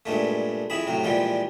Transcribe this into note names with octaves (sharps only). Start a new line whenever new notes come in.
G2 A#2 G#3 A3
F2 E4 G#4 B5
A2 C3 F#3
A#2 E3 F3 G3 G#3